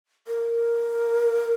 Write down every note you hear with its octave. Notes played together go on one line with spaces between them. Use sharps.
A#4